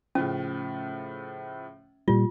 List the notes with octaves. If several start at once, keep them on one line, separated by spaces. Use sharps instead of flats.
A2 C#3 F3 C#4
A#2 G3 F4